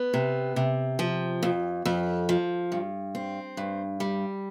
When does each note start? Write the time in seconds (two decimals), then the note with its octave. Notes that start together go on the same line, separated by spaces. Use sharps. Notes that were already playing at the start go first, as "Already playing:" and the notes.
Already playing: B3
0.14 C3
0.56 C3
0.99 F3
1.43 F2
1.85 F2
2.29 F3
2.72 G2
3.15 C4
3.57 G2
4.00 G3